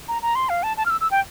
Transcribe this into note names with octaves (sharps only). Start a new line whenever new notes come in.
A#5
A#5
C6
F5
A5
A5
F6
E6
E6
G5